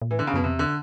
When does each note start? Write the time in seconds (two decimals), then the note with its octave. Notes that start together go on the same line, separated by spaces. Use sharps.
0.02 A#2
0.10 A2 E3
0.19 D3
0.27 C#3
0.33 F#2 B2
0.43 F2 C3
0.54 E2 D3